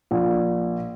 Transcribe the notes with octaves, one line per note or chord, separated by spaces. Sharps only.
A#1